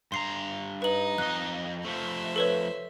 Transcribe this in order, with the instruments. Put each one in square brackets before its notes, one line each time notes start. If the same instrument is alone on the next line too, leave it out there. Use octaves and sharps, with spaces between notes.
[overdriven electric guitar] G2 A#5 [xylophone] C6 C7
[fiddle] D#4 [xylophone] B4 F#7
[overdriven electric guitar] F2 D#5 [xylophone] F#6
[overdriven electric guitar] F3 A3 [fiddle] C5 E5
[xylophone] A4 B4 C#5